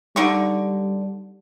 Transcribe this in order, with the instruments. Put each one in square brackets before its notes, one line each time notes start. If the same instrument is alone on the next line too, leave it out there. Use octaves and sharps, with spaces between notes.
[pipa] D3 D#4 C#6 [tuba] G3